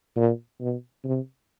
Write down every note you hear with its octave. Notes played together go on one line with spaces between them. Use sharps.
A#2
B2
C3